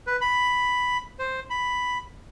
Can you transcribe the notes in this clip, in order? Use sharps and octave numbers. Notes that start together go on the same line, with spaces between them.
B4
B5
C5
B5